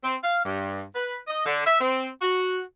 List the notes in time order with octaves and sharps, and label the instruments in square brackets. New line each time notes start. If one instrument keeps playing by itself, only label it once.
[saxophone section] C4
F5
G2
B4
D#5
D3
E5
C4
F#4